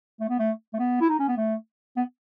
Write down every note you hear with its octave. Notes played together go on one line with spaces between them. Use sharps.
A3
B3
A3
A3
B3
E4
D#4
C#4
B3
A3
B3